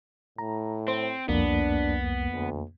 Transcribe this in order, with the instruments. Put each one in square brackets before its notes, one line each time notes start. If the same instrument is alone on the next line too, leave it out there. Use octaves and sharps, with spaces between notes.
[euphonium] A2 [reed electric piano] A#5
[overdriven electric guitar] C4 [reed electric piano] C5
[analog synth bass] C2 [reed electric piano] F2 A#3 [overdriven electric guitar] B3 [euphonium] D4
[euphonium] D2